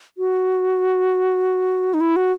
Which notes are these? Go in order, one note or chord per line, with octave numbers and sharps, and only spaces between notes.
F#4
D#4
E4
F#4